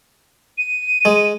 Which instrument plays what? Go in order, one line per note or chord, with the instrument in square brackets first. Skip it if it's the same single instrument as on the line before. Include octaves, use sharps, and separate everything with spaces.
[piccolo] D#7
[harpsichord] G#3